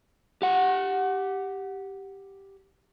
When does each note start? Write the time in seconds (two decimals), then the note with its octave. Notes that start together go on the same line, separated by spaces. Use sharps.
0.42 G4 F#5